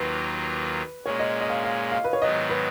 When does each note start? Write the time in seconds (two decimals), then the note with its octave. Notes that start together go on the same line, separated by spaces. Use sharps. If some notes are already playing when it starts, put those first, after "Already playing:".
Already playing: D#2 D#3 F#3 A#3 F4 B4
1.05 A#2 G#3 C#4 C#5
1.19 D#5
1.41 D#5
1.49 F5
1.64 F5
1.92 F5
2.04 B4
2.13 C#5
2.22 G#2 D#3 F#3 B3 D#5
2.49 B4